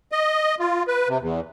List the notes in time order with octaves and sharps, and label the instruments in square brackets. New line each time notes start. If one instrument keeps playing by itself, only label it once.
[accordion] D#5
F4
B4
C3
E2